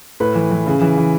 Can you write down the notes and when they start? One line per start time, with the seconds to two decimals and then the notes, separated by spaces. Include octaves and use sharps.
0.20 A2 B4
0.35 E3
0.51 E3
0.66 C#3
0.81 E3
0.97 E3